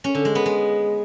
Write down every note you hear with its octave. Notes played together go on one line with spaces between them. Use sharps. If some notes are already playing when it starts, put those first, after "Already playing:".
C#4
D3
G#3
B3
G#3